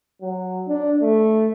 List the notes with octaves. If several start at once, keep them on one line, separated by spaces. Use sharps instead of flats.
F#3
D4
A3